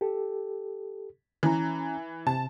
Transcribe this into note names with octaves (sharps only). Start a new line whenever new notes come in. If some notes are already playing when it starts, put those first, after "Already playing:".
G4 A4
E3 C#4 A#5
C3 A5